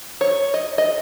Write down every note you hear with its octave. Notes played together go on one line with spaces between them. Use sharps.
C#5
D#5
D#5